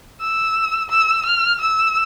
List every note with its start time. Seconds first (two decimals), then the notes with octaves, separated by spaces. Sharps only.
0.21 E6
0.90 E6
1.26 F6
1.61 E6